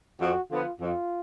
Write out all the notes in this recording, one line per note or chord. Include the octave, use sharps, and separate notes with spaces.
F2 F#4
D3 F3 B3 F4
F2 F4